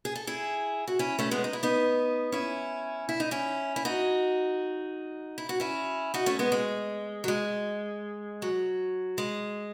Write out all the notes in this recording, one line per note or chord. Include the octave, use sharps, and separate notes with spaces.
G#4
A4
E4 G#4
F#4
C#4 E4
A3 C#4
G#3 B3
D#4
E4
B3 D#4
C#4 E4
E4
D#4
C#4 E4
E4
D#4 F#4
E4
F#4
C#4 E4
D#4 F#4
A3 C#4
G#3 B3
G#3
F#3
G#3
F#3
G#3